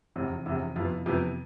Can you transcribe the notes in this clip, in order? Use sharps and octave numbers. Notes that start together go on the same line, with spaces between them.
F1 E2 C3
F1 E2 C3 E4
F2 C3 E3 B3 F4
F2 C3 E3 B3 G4